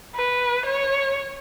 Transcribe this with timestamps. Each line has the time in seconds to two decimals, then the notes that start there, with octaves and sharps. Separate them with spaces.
0.15 B4
0.66 C#5